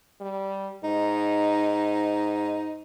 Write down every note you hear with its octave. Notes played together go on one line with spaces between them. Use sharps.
G3
G#2 D#4